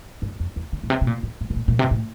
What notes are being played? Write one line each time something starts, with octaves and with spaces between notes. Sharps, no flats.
G2
F2
E2
D3
A#2
C3
C3
A#2
A2
A2
C3
A#2
A#2
C3
A2